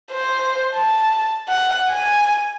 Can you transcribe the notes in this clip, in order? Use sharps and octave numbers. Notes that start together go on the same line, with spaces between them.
C5
A5
F#5
G#5